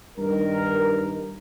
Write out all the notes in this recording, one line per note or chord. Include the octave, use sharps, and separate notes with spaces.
G2 D#3 A#4